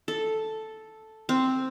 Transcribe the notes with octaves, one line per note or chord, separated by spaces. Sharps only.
A4
C4